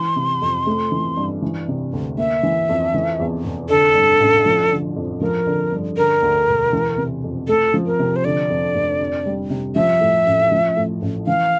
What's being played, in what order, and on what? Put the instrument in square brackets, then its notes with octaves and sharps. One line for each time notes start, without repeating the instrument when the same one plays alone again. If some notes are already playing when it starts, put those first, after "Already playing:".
Already playing: [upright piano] E3 [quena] C6
[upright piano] C3
F2
A3
E3
G2
E3
C3
D2
[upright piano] A#3 [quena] E5
[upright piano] E3
F2
E3
E2
F1
[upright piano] D3 [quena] A4
[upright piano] G2
A1
F3
D3
F2
[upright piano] F3 [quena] A#4
[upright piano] D3
G2
[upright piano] D3 [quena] A#4
[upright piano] D2
E1
E3
C3
F2
[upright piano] A3 [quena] A4
[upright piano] F3
[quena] A#4
[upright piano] C3
[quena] C5
[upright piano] D3 [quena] D5
[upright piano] F2
F1
D4
G3
C3
[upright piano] F3 [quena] E5
[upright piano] A2
A1
F3
A2
A1
[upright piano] E3 [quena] F5